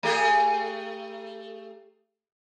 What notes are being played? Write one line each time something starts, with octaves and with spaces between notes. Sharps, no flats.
A3 G4 G#4